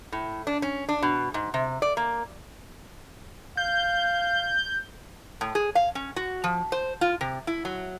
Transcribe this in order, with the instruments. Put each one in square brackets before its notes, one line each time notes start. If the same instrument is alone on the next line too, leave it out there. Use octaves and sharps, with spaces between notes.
[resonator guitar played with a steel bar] A2
D4
C#4
D4
B2
G#2
C3
D5
A#3
[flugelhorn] F5 [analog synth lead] G6
[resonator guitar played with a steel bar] A2
G#4
F5
C#4
F#4
F3
C5
F4
C3
E4
F#3